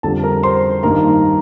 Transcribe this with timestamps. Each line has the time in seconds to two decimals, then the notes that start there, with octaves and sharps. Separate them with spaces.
0.03 F2 D3 G3 A4 A5
0.23 A#4 A#5
0.43 C5 C6
0.83 G2 D#3 A#3 D#4 A#4 A#5